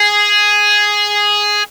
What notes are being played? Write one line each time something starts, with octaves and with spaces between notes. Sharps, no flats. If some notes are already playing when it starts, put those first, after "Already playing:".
Already playing: G#4